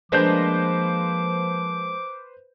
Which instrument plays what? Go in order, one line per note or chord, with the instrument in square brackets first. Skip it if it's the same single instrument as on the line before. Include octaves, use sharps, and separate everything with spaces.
[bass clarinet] F3 [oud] G#3 A#3 D4 [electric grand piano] B4 C5 G6 [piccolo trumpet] D6